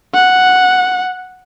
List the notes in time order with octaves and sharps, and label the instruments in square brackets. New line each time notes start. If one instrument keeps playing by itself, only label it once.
[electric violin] F#5